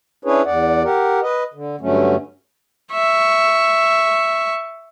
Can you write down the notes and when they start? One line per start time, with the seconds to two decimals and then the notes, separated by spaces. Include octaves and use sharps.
0.25 C#4 D4 E4 G#4 B4 C#5
0.45 E2 D5 F#5
0.84 G4 A#4 F#5
1.23 B4 D#5
1.54 D3
1.81 G2 D3 F#3 A3 C#4
2.92 E5 C#6